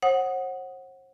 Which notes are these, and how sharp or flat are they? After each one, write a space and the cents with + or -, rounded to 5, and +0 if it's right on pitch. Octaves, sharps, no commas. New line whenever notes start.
C5 +45 F#5 +0 D#6 +0